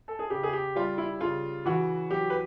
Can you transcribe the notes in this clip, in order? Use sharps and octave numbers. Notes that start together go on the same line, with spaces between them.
A4
G#4
C#3 G4
G#4
G4
G3 F4
E4
C#3 F4
E3 F#4
F#3 G4
B4